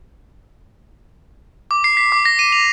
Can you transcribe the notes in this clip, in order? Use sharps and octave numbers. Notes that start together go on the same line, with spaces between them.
D6
C7
B6
D6
A#6
D#7
F7